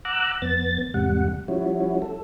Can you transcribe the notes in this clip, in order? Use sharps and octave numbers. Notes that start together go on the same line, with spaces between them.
F#5 A#5 D6 E6 F#6
F2 B3 A6
E2 G#2 C3 G3 F#5
F3 G3 C#4 E4 F#4
A4